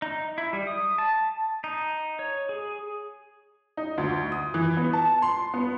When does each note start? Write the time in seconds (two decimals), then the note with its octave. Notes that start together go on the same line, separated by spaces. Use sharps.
0.02 D#4
0.38 E4
0.53 G3
0.67 D#6
0.98 A5
1.64 D#4
2.19 C#5
2.49 G#4
3.77 D#4
3.98 D2
4.32 D#6
4.54 E3
4.77 B3
4.93 A5
5.22 C6
5.54 B3